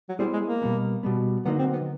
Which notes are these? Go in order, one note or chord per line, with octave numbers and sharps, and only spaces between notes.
F#3
G3 B3 E4 G#4 C5
G#3
A#3
B2 G3 B3
B2 G3 B3
D3 F#3 A#3 B3 D#4 F#4
C4
B3